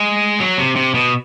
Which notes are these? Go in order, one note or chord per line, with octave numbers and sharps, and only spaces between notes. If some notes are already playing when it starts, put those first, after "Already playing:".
Already playing: G#3
F#3
C3
C3
B2